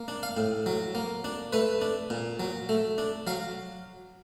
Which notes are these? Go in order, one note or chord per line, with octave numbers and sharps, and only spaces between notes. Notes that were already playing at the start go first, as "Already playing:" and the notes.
Already playing: A#3
D4
F5
A2
F#3
A#3
D4
A3 B4
D4
A#2
F#3
A3
D4
F#3 F5